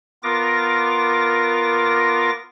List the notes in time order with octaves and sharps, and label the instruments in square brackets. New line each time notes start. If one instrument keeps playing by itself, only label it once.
[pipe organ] B3 F4 A#4 D6 A#6